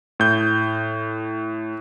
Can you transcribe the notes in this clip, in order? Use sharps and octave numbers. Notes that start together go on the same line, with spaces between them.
A2 G6